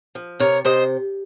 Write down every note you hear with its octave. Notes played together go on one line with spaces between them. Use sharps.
F3
C3 A#4 C#5
C3 C5 D#5